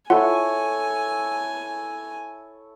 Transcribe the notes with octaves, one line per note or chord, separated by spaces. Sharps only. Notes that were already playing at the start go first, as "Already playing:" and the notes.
E4 F4 A4 C#5 F#5 G#5